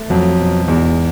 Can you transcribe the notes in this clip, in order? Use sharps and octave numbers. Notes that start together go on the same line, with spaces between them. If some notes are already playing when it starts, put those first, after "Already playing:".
Already playing: A3
F2 F#3
B2
E2 G#2